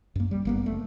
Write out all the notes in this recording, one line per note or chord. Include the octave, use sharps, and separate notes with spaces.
F#2 A#3
G3
G1 A#3 B3
F#1 A3